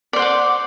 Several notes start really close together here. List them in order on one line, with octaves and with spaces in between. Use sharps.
D5 C5 F#5 D6